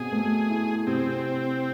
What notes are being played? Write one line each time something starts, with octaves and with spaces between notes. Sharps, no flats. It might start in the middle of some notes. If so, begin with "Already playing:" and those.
Already playing: B2 C4 G#4
A3
E4
C3 C4